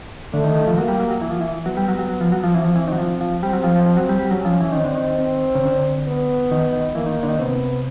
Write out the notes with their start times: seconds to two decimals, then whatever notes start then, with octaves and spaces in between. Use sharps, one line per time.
0.33 D3 A3
0.44 D#3
0.55 D#3
0.67 F3
0.77 F#3 A#3
0.88 G3
1.00 F#3
1.11 F#3
1.22 E3
1.31 F3
1.41 E3
1.66 F#3 B3
1.77 G3
1.88 F#3
1.99 F#3
2.09 F#3
2.21 F3
2.32 F#3
2.44 F3
2.53 E3 C4
2.64 F3
2.76 E3
2.87 D#3
2.92 F#3
2.98 F3
3.21 F3
3.42 G3 C4
3.53 F#3
3.64 F3
3.75 F3
3.86 F3
3.97 F#3
4.09 G3
4.19 G3
4.31 F#3 C#4
4.45 F3
4.61 E3
4.72 D#3 C4
4.84 D3
4.95 D#3
5.19 C4
5.55 C#3
5.63 D3
6.07 B3
6.51 D#3
6.73 D#3
6.95 E3 A#3
7.06 D#3
7.23 D3
7.29 D#3
7.39 C3 B3